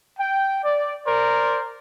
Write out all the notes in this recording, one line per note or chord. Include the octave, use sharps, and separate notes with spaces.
G5
D5
A#4 C5 D5